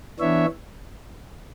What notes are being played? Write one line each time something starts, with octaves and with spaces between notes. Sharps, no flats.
E3 B3 D4 C#5 E5